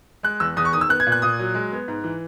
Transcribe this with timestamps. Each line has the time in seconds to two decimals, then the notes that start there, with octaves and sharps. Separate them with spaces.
0.23 G#3 F#6
0.40 E2 E6
0.57 E2 D#6
0.65 C#6
0.73 D#3 D#6
0.81 E6
0.89 B3 F#6
1.00 G#6
1.07 A#2
1.12 F#6
1.22 A#2 D#6
1.39 F#3
1.55 G#3
1.72 B3
1.88 G#2
2.04 E3